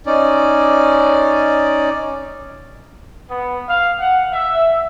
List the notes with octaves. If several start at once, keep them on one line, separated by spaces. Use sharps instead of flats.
C#4 D#4 D5
B3
F5
F#5
E5